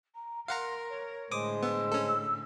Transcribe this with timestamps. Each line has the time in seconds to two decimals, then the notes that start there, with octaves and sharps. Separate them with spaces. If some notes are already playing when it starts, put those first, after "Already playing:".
0.15 A#5
0.48 A#4 F5 F#5 A#5 C6
0.89 C#5
1.31 A2 D3 G#3 C5 D6 D#6
1.63 B3 E6
1.92 C#4 A4